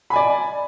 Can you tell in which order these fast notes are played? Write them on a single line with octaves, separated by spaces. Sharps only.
B5 G#5 D5